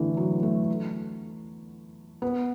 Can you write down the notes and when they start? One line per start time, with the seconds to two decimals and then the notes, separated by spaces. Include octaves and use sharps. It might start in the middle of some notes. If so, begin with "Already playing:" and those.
Already playing: D3 E3 A3
0.17 F#3
0.43 A3
2.22 B3